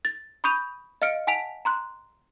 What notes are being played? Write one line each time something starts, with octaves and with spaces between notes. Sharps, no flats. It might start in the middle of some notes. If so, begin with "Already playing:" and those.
A6
B5 C#6 D#6 G6 D#7 F7
D#5 F5 F6 C#7 D7
F#5 G#5 A5 B6 D7 F7
A#5 C6 F#6